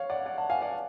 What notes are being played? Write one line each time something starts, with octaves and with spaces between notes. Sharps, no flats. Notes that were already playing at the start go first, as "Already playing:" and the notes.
Already playing: C#5 F5
D5 F#5
D5 F#5
F#5 A5
F5 G#5
D5 F#5